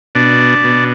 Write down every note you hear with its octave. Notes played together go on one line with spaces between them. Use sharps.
B2 D4
B2